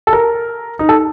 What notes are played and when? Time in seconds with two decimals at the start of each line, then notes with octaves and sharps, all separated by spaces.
0.07 A4
0.13 A#4
0.79 D#4
0.89 A4